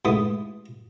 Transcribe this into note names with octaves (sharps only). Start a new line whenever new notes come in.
A1 G#2 E3 D#6